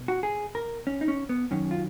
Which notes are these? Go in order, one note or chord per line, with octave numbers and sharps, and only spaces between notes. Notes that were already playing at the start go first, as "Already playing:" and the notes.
Already playing: B2
F#4
G#4
A#4
C#4
D#4
C#4
B3
F#2 D#3 F#3 C#4
F4